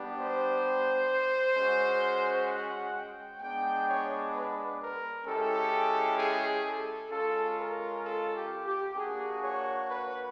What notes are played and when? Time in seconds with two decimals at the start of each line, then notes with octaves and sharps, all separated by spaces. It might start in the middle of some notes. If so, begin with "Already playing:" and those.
Already playing: G3 B3 D4 G4
0.17 C5
1.56 G#3 C#4 F#4
2.48 F#5
2.95 G5
3.40 G#3 B3 D4 G5
3.87 C#5
4.33 B4
4.79 A#4
5.25 G#3 C#4 E4 G4 A4
6.17 G#4
6.63 A4
7.09 G#3 C#4 F4 A4
7.56 A#4
8.03 A4
8.33 G4
8.64 G4
8.94 A#3 D4 F#4 G#4
9.41 C#5
9.87 B4